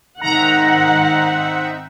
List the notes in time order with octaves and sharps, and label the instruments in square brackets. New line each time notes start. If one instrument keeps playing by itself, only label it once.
[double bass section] G#2 D#3 [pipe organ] C4 D#4 E5 [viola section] F#5 [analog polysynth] A#5